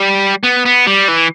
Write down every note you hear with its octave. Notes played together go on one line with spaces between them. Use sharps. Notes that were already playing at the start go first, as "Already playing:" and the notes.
Already playing: G3
B3
B3
G3
E3